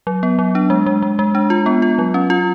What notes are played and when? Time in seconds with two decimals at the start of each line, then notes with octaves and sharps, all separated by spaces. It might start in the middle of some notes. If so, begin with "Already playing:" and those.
0.07 F#3
0.23 B3
0.39 F#3
0.55 D4
0.70 G#3
0.86 G#3
1.02 G#3
1.19 G#3
1.35 D4
1.50 F4
1.66 B3
1.82 F4
1.98 F#3
2.14 C#4
2.30 F4